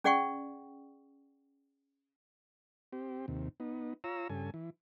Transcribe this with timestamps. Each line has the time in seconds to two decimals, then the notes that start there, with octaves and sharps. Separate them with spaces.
0.04 C#4 G#4 D5 F#5 G5 C#6
2.93 C4 G4
3.28 D#2 C3
3.60 B3 D#4
4.04 F4 C#5 A#5 E6
4.30 G2 C#3 A4 G#5
4.54 E3